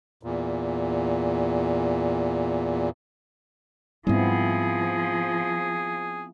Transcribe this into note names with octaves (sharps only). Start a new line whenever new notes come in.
E2 A#2
G#2 F3 G3 B3 C4 E4 G#4